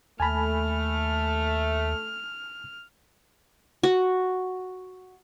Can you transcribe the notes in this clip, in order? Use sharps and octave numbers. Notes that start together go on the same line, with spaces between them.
D#2 A3 G#5 A5 B5 F6
F#4